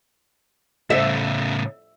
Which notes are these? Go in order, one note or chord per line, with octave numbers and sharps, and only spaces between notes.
A2 C#3 E5